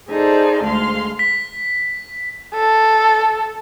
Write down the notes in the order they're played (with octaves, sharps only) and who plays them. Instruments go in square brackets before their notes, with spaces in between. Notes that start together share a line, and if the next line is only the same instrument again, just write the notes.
[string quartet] D#4 G#4 A4 C5 D5 F5
D2 G#3 F5 C6 F6
[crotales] B6
[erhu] A4